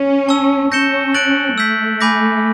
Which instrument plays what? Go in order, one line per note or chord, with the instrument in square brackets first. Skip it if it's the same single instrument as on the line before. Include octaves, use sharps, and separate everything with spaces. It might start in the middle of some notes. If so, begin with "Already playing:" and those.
Already playing: [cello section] C#4
[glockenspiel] A5 C#6 E6
[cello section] C#4 [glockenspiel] G6 A#6 C#7 E7 G7
[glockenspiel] F#6 A6 D7 F#7
[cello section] A3 [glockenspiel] E6 G6 B6
[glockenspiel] G#5 B5 D6 G6 A#6